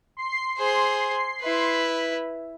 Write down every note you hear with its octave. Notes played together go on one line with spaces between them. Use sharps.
C6 C7
G#4 C5
E4 B4